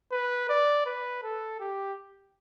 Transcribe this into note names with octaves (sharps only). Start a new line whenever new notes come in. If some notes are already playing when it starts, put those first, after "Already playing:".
B4
D5
B4
A4
G4